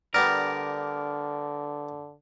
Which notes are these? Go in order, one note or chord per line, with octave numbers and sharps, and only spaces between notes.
D3 G3 B3 D4 A#4